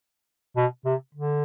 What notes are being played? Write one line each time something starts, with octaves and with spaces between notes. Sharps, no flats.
B2
C3
D3